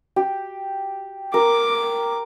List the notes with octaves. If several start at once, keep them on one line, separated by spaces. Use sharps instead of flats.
G4
A#4 D6